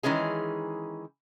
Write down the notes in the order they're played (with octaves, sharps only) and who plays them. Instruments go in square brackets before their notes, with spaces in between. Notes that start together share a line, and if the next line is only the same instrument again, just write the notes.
[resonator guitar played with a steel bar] D#3 E3 G#3 C#4 G#4